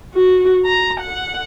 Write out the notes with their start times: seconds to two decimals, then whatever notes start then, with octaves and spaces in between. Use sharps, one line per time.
0.15 F#4
0.66 A#5
1.00 F#5